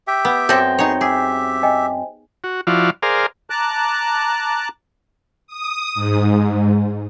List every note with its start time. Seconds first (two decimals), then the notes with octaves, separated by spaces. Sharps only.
0.07 G4 E5 G5
0.25 B3
0.49 F#2 C4 A4 G6 A#6
0.79 B3 D#4 G#4 C#5
1.01 G4 G#4 E5
1.63 D#5 G5 G#5
2.44 F#4
2.67 F3 E4 F#4 D5 F5
3.03 G#4 A#4 C5 D5 F5
3.50 A5 A#5 D6 F#6
5.47 D#6
5.95 G#2